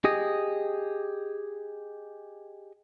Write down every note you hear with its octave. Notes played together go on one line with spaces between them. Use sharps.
G4 G#4 D#5